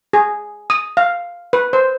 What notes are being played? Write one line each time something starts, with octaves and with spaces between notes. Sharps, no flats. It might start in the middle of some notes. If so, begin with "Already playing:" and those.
G#4
D#6
F5
B4
C5